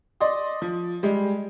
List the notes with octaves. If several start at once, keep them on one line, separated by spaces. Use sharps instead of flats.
D5 D#5 C6 D#6
F3
G3 G#3